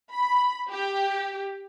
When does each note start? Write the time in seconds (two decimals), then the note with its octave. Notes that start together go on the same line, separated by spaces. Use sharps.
0.13 B5
0.69 G4